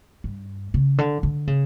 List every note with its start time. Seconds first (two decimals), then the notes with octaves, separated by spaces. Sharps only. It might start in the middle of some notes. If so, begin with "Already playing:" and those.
0.24 G2
0.74 C#3
0.98 D3
1.23 D3
1.47 C#3